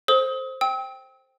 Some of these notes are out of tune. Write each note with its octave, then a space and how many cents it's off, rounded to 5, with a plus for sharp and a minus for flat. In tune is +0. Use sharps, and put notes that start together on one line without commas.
A4 +0 C5 +10 D#6 +35
G5 +0 E6 -40